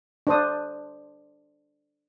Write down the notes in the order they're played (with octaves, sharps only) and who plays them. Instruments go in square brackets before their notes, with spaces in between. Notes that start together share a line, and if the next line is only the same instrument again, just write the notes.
[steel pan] D4 C5 D#6